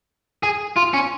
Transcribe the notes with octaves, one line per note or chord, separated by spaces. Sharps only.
G#4
F4
C#4